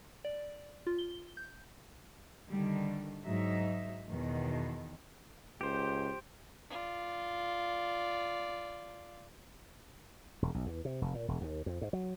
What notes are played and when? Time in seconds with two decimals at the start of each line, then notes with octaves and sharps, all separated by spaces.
0.25 D5
0.87 F4
0.98 G7
1.37 G6
2.49 D3 D#3 G3
3.25 G#2 F#3 D#4 E5
4.10 E2 B2 D#3
5.61 C#2 G4 C5
6.70 F4 D5
10.42 E1
10.54 B1
10.66 E2
10.85 C3
11.02 F1
11.14 A#2
11.28 E1
11.41 D#2
11.66 F2
11.81 G#2
11.93 F#3